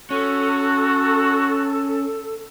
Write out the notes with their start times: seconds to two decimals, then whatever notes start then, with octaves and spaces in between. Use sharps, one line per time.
0.11 C#4 F#4 A4